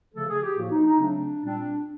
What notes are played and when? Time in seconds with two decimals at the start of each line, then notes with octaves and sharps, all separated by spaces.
0.14 C#3 F3 A3 A4
0.28 G#4
0.43 G4
0.56 A2 F3 A#3 F#4
0.71 D#4
0.85 D#4
0.99 C#3 F#3 A3 C4 D4
1.42 A#2 G3 C4 D4